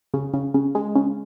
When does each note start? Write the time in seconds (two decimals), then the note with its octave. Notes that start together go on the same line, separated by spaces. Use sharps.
0.14 C#3
0.34 C#3
0.54 C#3
0.75 G#3
0.95 C#3